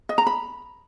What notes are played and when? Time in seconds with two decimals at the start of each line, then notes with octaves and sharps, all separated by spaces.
0.09 D#5
0.18 A#5
0.27 B5